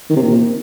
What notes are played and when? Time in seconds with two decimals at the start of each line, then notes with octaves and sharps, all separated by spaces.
0.10 D#3
0.16 C3
0.23 A#2